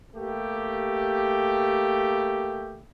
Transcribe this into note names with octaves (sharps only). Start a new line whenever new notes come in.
A3 A#3 G4